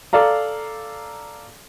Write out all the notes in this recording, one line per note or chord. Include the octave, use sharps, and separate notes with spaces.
A4 D5 F5 A#5